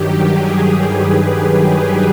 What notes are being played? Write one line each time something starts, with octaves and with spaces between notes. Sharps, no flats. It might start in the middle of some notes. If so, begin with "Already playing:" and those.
Already playing: G2 D#3 F#3 G4
G#4
B4